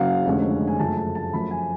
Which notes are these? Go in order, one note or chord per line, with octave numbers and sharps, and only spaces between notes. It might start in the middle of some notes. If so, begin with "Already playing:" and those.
Already playing: F#1 F#2 C#3 F#3 F5 F#5
F1 F2 D3 G#3 C#4
G#5
F#2 C#3 F3 A3 A5
A5
A5
F#2 F3 A3 B5
G#5